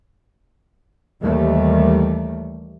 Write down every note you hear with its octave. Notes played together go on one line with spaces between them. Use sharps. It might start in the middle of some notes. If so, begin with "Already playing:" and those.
D#2 D#3 E3 G3 A3